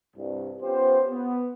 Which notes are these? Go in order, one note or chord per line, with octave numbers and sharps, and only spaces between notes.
C2 G2
B3 C#4 F4 G4 C5
B3